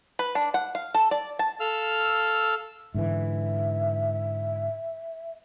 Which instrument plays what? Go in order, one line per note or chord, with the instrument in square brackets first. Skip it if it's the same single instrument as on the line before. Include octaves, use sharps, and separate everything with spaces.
[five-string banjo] B4
D4
F#5
F5
A4
D5
A5
[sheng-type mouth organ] A4 F5 E6 F6
[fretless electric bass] G#2 D3 E3 [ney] E5